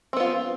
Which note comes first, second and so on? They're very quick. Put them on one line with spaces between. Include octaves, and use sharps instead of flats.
C4 B3 F4